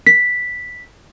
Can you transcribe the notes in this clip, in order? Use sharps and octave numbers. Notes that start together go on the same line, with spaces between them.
B6